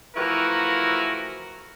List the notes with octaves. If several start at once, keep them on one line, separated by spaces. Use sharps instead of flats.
E3 F3 A3 E4 F#4 A#4